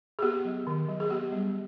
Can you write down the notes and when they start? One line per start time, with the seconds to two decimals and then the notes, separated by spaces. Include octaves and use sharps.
0.19 G#4
0.22 B3 G4
0.45 F#3
0.67 D#3
0.89 F#3
1.00 G#4
1.10 B3 G4
1.32 G3